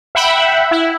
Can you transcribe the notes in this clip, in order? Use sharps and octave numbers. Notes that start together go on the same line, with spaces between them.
E5 F#5 G5 B5
E4